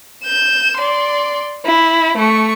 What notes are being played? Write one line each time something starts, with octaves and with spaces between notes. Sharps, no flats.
G6 E7
D5 C6
E4
A3 C#6